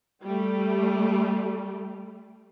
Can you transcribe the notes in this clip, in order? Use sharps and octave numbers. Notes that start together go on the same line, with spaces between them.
G3 A3